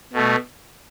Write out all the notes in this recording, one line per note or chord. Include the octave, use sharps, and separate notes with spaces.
B2 A3